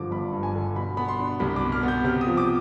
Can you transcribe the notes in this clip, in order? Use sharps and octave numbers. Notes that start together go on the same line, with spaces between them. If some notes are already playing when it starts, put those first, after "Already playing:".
Already playing: G2 D3 F3 D6
G1 B5
G2
G#5
D3
B2 B5
B3 B5
C6
D4
C2 B5
D6
B2
F6
B3 G6
C3 F6
D#6
F3
D6